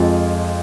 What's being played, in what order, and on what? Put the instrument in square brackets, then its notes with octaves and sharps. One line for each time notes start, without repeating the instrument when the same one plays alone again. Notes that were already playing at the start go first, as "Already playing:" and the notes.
Already playing: [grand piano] F2 F3 G#3 F4